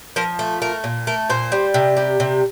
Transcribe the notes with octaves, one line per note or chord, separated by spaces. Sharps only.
F3 A#4
A3
A3 A#4
A#2
A3 A#4
A#2 C5
G3
C3
G3
C3